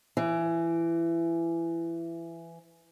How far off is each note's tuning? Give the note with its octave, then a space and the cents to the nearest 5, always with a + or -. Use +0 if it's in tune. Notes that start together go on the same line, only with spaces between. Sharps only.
E3 +20